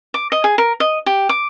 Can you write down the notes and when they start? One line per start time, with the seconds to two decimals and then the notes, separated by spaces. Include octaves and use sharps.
0.14 D6
0.32 D#5
0.44 G#4
0.58 A#4
0.80 D#5
1.06 G4
1.29 D6